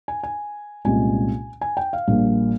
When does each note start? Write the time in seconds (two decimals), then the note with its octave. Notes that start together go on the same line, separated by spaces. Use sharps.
0.08 G#5
0.23 G#5
0.85 C2 A#2 G#3 C#4 F4 G#5
1.61 G#5
1.77 G5
1.93 F5
2.07 A#1 A#2 G3 A#3